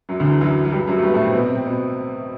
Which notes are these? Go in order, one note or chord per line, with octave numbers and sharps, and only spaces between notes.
F#2 F#3
D2 D3
E2 E3
F#2 F#3
F#3
G2 G3
G3
F#2 F#3
A3
G2 G3
B3
A2 A3
C3 C4
B2 B3
C3 C4
C3 C4
B2 B3